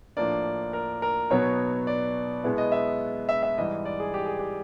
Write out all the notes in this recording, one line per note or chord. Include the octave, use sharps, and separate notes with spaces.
A2 F3 A#3 D4 D5
A#4
A#4
B2 F#3 B3 D#4 C#5
D5
B2 G#3 B3 E4
D#5
E5
E5
E5
G#2 E3 G3 D#5
D5
G#4
G4
G#4
G4